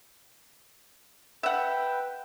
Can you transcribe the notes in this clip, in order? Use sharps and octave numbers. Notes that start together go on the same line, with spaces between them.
B4 E5 F#5 G5